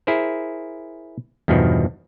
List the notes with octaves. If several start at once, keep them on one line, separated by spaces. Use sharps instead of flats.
E4 G#4 A#4 C5
E2 G2 B2 D#3 F3